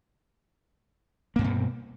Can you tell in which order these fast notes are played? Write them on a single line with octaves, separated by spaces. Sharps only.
A#3 G2 C4 B2